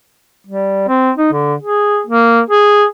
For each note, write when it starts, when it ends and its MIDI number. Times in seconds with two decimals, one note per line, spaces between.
0.47 0.85 55
0.88 1.11 60
1.17 1.30 63
1.33 1.54 50
1.62 2.01 68
2.07 2.40 58
2.50 2.84 68